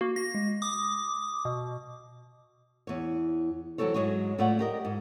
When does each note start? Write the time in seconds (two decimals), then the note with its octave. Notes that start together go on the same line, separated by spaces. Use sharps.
0.01 A#3 F#4
0.16 A#6
0.35 G#3
0.62 D6 D#6
1.45 B2
2.87 E2 C#5
3.78 E3 F#3 G#3 C4 A4 C#5
3.94 G#2 B2 F#3 G#3 G#4 C#5
4.38 A2 E4 F4 C#5 D5 F#5
4.59 G4 A#4 D#5
4.85 G#2